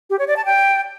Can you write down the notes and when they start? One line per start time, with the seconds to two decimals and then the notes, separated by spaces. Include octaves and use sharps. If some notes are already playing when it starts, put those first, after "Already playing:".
0.10 G4
0.19 C#5
0.28 D5
0.37 A5
0.45 G5